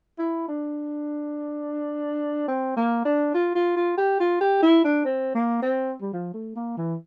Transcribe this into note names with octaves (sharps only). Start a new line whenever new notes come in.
E4
D4
C4
A#3
D4
F4
F4
F4
G4
F4
G4
E4
D4
C4
A#3
C4
G3
F3
A3
A#3
E3